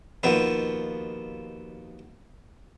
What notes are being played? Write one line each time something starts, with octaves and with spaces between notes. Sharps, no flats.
D#2 B2 F3 B3